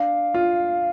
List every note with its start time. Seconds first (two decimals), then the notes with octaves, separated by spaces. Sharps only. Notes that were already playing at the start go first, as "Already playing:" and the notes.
Already playing: D4 F5
0.34 F4